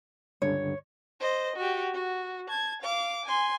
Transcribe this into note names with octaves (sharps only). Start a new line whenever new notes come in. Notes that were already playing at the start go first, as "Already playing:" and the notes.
C#2 G2 D3 C#5
C5 D#5
F#4 G4
F#4
A5 G#6
F5 D6
G#5 C6